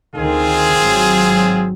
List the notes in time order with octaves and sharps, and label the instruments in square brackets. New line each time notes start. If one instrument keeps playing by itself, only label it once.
[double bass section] D2 D#3 [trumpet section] C4 F4 G#4
[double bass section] G#1 F#3